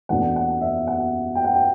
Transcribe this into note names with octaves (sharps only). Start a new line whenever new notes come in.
E2 B2 A3 D4 F#5
F#5
E5
F#5
G5
F#5
G5